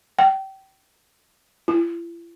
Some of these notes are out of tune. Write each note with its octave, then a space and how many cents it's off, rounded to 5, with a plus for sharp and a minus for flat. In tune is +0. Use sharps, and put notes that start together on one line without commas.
G5 -25
E4 +45